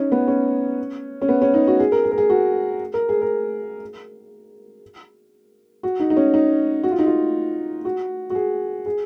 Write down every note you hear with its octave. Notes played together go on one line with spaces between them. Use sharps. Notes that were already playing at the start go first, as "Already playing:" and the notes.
Already playing: C#4 D#4
B3
C#4
C#4
B3
C#4
D#4
F#4
G#4
A#4
G#4
A#4
G#4
F#4
A#4
G#4
A#4
F#4
D#4
D#4
C#4
D#4
F#4
F4
D#4
F4
F#4
F#4
G#4
G#4